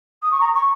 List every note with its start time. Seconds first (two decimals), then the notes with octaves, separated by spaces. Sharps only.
0.22 D#6
0.31 C#6
0.40 A#5
0.54 C#6